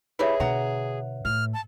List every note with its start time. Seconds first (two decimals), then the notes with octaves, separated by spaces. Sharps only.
0.19 E4 G4 G#4 B4 C#5 E5
0.40 B2 D3 F#5 A#5
1.25 A2 F6
1.54 A5